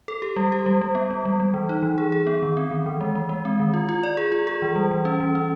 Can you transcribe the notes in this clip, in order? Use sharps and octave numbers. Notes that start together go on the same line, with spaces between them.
A4
G4
G3
G4
G3
G3
B3
G3
G3
G3
E3
D#4
E3
G#4
G#4
B3
D#3
C4
D#3
E3
G#3
G#3
G#3
C4
D#3
F4
F4
D5
G#4
F4
G#4
E3
G3
E3
C#4
E3
C#4